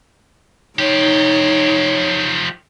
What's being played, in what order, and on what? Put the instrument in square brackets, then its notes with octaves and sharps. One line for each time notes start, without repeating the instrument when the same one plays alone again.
[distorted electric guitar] F3 G4 [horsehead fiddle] D#4 [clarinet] C#5